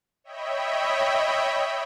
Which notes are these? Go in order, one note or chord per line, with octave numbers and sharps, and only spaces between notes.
C#5 D#5 E5 G5 B5